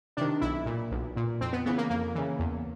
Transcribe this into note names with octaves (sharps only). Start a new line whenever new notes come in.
C3 D#3 D4
B1 E4
A#2
B1
A#2
F2 C4
B3
C#3 E3 B3
A#3
F2 A#3
C#3 E3
E2